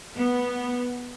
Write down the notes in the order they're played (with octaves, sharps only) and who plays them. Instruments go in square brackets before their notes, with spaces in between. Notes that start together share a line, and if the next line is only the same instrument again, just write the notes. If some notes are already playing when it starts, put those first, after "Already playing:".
[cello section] B3